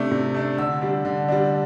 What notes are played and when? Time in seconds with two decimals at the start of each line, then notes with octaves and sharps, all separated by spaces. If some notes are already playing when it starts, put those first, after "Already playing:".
Already playing: C3 A3 D4
0.11 C3
0.34 A3 D4
0.58 D3 E6
0.81 G3 D4
1.05 D3
1.28 G3 D4